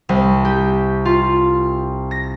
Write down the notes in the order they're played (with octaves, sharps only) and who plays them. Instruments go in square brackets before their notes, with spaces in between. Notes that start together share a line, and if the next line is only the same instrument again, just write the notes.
[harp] C2
G4
F4
A#6